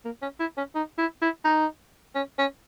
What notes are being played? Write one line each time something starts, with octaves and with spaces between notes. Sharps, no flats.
A#3
C#4
E4
C#4
D#4
E4
E4
D#4
C#4
C#4